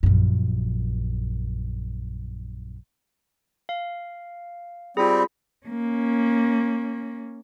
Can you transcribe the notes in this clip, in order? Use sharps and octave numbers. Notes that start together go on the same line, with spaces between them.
A#1 F#2
F5
G3 C4 F4 G#4 B5
A#3 C#4